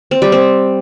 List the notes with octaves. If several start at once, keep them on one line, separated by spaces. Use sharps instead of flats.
C4
G3
C4